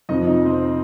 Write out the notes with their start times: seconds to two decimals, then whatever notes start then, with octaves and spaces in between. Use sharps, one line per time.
0.09 F2 C3 F3 D#4 D#5
0.27 D#4 D#5
0.45 C4 C5